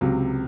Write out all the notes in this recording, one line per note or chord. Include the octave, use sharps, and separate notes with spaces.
C#2 C3 F#3